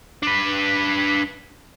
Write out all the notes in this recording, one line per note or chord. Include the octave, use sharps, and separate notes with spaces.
D4 B4